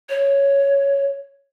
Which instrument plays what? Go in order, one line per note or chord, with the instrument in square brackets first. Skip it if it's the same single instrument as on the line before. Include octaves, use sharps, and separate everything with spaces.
[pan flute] C#5